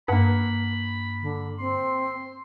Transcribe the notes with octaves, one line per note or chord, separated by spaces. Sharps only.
G2 A#3 F#5 B5
D3
C4 C6